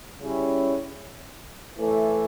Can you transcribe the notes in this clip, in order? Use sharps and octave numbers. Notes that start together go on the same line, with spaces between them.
C#3 G3 C#4 E4
A2 E3 A3